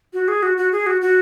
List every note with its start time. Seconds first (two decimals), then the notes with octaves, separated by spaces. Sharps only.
0.13 F#4
0.28 G#4
0.43 F#4
0.57 F#4
0.72 G#4
0.86 F#4
1.02 F#4